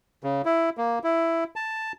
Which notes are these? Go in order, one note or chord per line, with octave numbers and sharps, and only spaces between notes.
C#3
E4
A#3
E4
A5